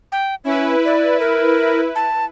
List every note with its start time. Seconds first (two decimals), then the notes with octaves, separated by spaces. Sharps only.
0.12 G5
0.44 C#4 E4 B4
0.85 D5
1.20 A#4
1.95 A5